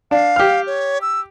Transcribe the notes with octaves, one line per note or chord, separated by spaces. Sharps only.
D4 F5
G4 F6
C#5
E6